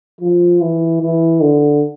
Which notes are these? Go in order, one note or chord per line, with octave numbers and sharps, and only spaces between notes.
F3
E3
E3
D3